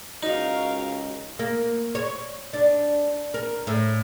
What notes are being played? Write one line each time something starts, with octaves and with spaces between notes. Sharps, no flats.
C#2 D#4 F#4 A#4 F5
A#3
C#5
D4
A#4
A2